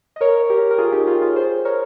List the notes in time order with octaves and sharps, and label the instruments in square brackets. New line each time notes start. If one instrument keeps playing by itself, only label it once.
[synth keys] D#5
A#4 C#5
G4 A#4
A#4
F4 G#4
D#4 G4
F4 G#4
F4 G#4
G#4 C5
A#4 C#5